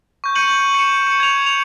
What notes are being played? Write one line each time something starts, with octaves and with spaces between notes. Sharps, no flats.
C#6 G6
G6 C#7 D#7 F#7
C#7 E7
C#7
G#6 F7
F7